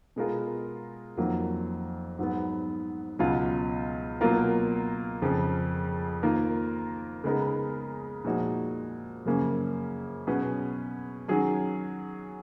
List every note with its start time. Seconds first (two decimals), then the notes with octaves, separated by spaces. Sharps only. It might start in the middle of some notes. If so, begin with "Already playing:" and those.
0.16 B2 G#3 B3 F4 A#4
1.17 F2 D#3 F#3 A#3 F4
2.19 G#2 F#3 B3
3.19 C#2 B2 F#3 C#4 F4
4.21 B2 F#3 A#3 F4 A#4
5.22 F2 C#3 F3
6.23 D#3 A#3 F4 A#4
7.24 C#3 G#3 B3 D#4 A#4
8.24 A#2 F3 G#3 D#4 F#4
9.26 F#2 C#3 F3 A#3 C#4
10.27 B2 F#3 C#4 G#4 B4
11.28 D#3 F#3 C#4 G#4